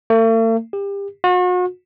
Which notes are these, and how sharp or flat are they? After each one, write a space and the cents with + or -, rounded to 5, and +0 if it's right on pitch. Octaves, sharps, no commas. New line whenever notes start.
A3 +45
G4 +30
F#4 -40